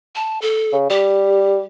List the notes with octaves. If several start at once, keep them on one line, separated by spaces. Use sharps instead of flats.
A5
A4
C#3
G3 G4